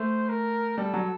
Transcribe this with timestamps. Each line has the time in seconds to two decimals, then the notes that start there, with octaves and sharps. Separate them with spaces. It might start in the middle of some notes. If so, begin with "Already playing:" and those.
Already playing: A3 C5
0.29 A#4
0.78 G3 A4
0.93 F#3